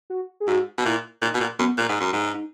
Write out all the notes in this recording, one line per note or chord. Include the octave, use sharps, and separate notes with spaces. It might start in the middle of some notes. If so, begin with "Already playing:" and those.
F#4
G#4
G#2 F#4
B2
A#2 E4
A#2 D#4
B2
A#2
F#2 B3
A#2
G#2
F#2
G#2
D#4